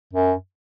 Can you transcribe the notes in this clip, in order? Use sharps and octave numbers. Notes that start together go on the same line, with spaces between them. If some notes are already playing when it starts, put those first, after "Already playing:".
F#2